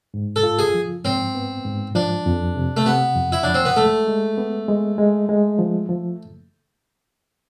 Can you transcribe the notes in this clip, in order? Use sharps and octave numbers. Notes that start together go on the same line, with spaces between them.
G#2
A4
F4
G#4
F3
G#2 C4
B3
G#2
F3 D4
F2
C3
A3
C3 B3
F2
E4
F3 D4
C4
B3
G#3 A3
G#3
B3
G#3
G#3
G#3
F3
F3